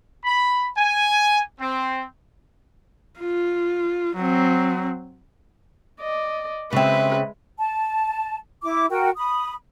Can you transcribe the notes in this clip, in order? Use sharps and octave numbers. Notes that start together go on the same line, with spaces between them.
B5
G#5
C4
F4
F#3 C4
D5 D#5
C#3 G#3 C4 B4 E5
A5
E4 D6
F#4 A#4 G5
B5 D#6